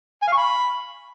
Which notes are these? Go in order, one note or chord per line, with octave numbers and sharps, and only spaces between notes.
G#5
F5
C#6
B5